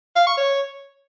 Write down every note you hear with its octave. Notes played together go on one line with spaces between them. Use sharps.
F5
C#6
C#5